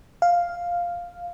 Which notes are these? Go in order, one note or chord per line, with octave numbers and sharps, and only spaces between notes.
F5